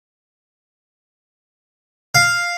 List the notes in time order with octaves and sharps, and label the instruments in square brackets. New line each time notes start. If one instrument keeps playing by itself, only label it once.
[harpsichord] F5